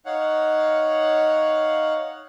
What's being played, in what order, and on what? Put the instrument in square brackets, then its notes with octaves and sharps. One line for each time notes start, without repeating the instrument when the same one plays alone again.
[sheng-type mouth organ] D#4 C#5 F5 F#5